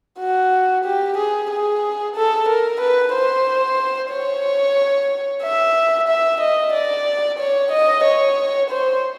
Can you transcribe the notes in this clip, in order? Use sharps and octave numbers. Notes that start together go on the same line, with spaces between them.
F#4
G4
G#4
G#4
A4
A#4
B4
C5
C#5
E5
E5
D#5
D5
C#5
D#5
C#5
C5